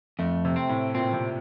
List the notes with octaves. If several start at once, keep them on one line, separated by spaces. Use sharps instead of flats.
F2 A3
C3
C4
A2
A#2 C4
C3